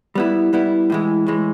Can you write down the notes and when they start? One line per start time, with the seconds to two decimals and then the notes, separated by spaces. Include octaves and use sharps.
0.15 G3 B3 E4
0.53 G3 B3 E4
0.90 A2 E3 G#3
1.27 A2 E3 G#3